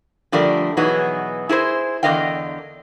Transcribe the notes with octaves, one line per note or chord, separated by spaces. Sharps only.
D3 F3 G3 A3 A#4 D5
B2 E3 F#3 B3 D#4 G#4
E4 G#4 A#4 C5
E2 D3 A#4 D#5 F5 G5